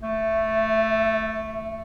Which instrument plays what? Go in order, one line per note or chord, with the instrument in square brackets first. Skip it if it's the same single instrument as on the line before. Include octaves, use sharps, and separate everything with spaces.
[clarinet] A3 [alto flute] E5